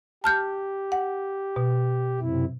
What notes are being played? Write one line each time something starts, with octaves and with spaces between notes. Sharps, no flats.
G4 A5 F6 G6
F#5
B2
F#2 C3 E4